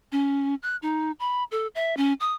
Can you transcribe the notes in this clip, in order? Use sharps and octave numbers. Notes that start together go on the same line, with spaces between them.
C#4
F#6
D#4
B5
A4
E5
C#4
D#6